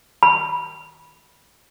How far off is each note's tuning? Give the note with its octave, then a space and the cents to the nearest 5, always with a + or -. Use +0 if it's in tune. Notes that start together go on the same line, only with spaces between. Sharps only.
B5 -20